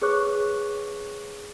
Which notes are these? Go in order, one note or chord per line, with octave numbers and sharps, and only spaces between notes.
G#4 B4 C#5 C#6 D6 F#6